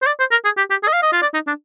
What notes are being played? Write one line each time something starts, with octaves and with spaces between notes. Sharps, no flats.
C5
D5
C5
A#4
G#4
G4
G4
G#4
D#5
F5
D#5
F4
D5
D#4
D4